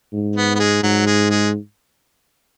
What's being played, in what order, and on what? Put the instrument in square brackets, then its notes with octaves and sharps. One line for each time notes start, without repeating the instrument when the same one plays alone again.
[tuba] G#2
[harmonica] B3
B3
G#3
[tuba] G#2 [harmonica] F#3
[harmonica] G#3
G#3